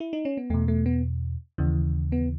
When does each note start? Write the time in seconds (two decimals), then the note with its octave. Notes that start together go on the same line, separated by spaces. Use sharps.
0.00 E4
0.13 D#4
0.25 C#4
0.37 B3
0.50 E2 B2 A3
0.68 A3
0.86 B3
1.58 D#2 C#3 E3
2.12 B3